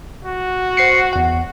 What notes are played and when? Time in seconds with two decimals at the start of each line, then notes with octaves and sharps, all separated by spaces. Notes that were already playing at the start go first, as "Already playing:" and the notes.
0.25 F#4
0.77 C5 C7 C#7
1.13 E2 F#5